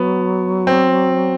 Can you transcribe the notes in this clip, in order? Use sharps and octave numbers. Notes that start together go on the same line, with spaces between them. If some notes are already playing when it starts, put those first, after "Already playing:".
Already playing: F#3 B3
C4